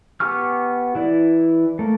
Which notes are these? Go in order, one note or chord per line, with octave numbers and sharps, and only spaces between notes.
B3 G4 G#5 C#6 F6
E3 E4 D5
A3 A#3